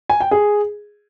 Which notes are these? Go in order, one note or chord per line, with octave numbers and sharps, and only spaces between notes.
G#5
G5
G#4